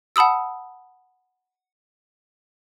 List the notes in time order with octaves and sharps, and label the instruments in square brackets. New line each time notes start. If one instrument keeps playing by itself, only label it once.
[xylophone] F#5 A5 B5 D#6 E6